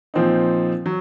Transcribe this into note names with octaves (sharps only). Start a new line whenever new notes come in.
A#2 F3 C4 D#4
F#3